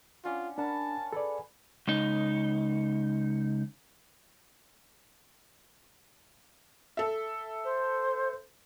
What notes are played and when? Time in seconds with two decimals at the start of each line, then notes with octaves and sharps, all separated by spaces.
0.25 C#4 D4 F4 F#5
0.58 D4 A#4 F#5 A5 B5
1.13 G#4 A4 B4 C#5 D5
1.88 C#2 D#4
6.97 A4 E5
7.64 C5